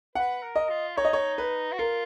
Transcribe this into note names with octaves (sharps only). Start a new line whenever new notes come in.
B4 F#5
A#4
D#5
F4
D#4 C#5
D#5
C#5
B4
F#4
F4 A#4